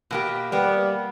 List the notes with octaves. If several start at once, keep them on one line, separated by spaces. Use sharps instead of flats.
B2 A#3 G4
G3 A#3 B3